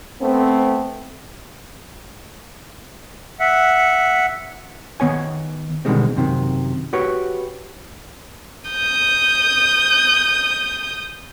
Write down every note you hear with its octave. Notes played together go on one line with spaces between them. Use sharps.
A3 B3 C4
E5 F#5
D#3 B3 C#5 G#5
B2 D3 D#3 G3 G#3 C4
F#2 C3 D#3
F#4 G4 B4 C#5
D#6 G6